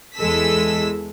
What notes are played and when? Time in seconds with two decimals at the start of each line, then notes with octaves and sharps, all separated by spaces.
0.16 E2 E3 G#3 A4 E6 B6